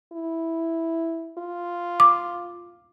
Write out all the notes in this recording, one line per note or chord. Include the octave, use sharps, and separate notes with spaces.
E4
F4
D6